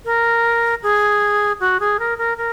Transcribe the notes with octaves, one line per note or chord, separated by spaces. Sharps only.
A#4
G#4
F#4
G#4
A#4
A#4
A#4